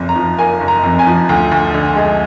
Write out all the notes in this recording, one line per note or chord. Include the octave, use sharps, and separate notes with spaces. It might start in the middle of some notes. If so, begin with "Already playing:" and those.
Already playing: F#1 F2
A#5
F3
A#3 G#5
F#1
A#5
F2
G#5
F3
D2
D2
D3
G#3